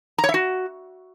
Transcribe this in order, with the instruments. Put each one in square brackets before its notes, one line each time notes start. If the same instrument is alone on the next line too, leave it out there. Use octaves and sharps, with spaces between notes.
[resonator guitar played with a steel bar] A#5
C#5
E5
F#4